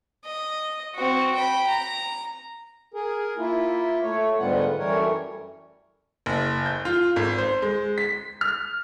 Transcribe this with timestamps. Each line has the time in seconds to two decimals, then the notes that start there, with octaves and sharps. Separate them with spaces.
0.25 D#5
0.95 C4 F#4
1.35 G5 B5
1.67 A#5
2.93 G#4 A#4
3.38 A#3 E4 F4
4.03 A3 C#5
4.39 G#2 D3 G3 B3 F4 F#5
4.79 F#2 E3 G3 A3 A#4 C#5
6.26 F#1
6.66 G6
6.85 F4
7.16 G#1
7.38 C5
7.62 G#3
7.98 B6
8.41 F6